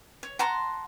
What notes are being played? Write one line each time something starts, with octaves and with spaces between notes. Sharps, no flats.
C#5
F#5 A5 A#5 C6